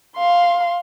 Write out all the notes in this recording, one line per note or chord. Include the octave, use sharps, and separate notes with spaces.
F5 C6